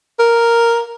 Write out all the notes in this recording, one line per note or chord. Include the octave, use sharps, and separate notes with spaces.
A#4